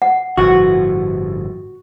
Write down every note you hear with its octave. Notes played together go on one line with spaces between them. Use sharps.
F#5
G1 A2 F3 F#4